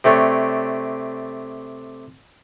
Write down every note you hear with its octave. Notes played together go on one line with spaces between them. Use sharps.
C3 A3 D4 C#5